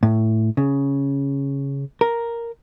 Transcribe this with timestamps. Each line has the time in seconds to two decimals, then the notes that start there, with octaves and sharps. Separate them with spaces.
0.03 A2
0.57 C#3
2.01 A#4